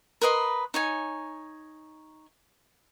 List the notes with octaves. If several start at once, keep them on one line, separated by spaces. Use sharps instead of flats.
A#4 B4 D#5 C6
D#4 C#5 G#5